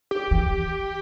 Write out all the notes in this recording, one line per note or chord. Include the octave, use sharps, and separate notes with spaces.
G4
E3